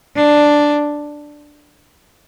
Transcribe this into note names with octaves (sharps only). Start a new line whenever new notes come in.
D4